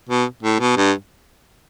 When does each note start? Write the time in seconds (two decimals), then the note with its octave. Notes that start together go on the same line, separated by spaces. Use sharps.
0.09 B2
0.43 A2
0.60 B2
0.77 G2